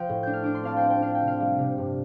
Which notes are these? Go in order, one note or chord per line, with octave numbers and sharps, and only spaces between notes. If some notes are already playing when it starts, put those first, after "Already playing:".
Already playing: F3 G5
A2
D4 G6
F6
D4 D6
C6
C4 F5 A5
G5 C6
C4
G5
D4 F5
G5
C3
F5
G3
C3
G2